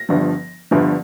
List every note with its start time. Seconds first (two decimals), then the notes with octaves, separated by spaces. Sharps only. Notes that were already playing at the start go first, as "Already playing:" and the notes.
Already playing: A#6
0.09 G1 G2 D3 F3
0.71 G1 G2 D3 F3